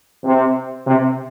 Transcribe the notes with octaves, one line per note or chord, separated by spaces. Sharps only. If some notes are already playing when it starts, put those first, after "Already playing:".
C3
C3